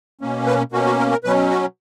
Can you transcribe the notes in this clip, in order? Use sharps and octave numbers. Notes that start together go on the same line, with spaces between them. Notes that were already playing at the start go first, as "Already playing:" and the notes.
B2 A#3 C#4
B4
B2 A#3 C#4 F#4
F#4
A#4
A#4
B2 F#3 C#4 B4
F#4